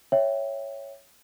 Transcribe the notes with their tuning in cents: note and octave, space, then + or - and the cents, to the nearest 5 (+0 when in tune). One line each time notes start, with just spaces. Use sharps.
C#5 +0 E5 +0 G5 +0